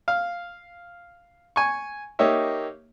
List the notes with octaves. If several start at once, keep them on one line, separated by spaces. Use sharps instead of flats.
F5
G#5 C#6
A#3 D#4 G4 C#5 E5